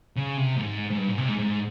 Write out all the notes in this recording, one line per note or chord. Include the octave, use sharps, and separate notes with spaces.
C#3
C3
G#2
G#2
G2
G#2
C3
G#2
G#2